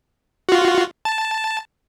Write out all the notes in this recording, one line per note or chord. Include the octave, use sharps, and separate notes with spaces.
F4 F#4
A5